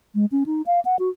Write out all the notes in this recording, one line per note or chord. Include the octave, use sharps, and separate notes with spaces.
G#3
C#4
D#4
F5
F#5
F#4